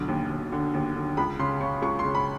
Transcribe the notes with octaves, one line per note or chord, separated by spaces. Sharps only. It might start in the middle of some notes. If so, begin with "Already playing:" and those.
Already playing: B1 D3
D#2
D#2
D3
D#2
D3
C#2 B5
C#3 C6
C#3 C#6
C#2 C#6
C#3 C6
B5